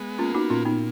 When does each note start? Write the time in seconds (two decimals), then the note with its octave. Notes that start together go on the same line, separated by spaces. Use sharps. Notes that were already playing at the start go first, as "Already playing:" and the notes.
Already playing: G#3 B3
0.19 A#3 C#4 F4
0.34 D#4 F#4
0.50 A#2 C#4 F4
0.65 B3 D#4